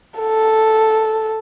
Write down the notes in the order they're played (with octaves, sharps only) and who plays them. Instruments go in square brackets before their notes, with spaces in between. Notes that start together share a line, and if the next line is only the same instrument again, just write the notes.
[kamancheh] A4